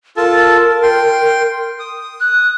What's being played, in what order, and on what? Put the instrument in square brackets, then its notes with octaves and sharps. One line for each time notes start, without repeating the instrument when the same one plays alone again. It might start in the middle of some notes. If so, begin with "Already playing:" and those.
[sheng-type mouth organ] F4 A4 A5 [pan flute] A#4
[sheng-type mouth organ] G5 C6
D#6
[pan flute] F#6